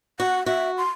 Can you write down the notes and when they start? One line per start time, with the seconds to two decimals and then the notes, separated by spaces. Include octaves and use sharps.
0.20 F#4 F#5
0.46 F#4 E5
0.78 C6